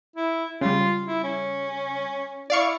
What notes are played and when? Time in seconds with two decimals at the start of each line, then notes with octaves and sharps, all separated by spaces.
0.16 E4
0.61 C#3 G3 F4
1.06 E4
1.23 C#4
2.50 E4 D5 F5 C#6